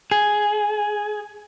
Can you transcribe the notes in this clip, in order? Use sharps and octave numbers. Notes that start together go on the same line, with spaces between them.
G#4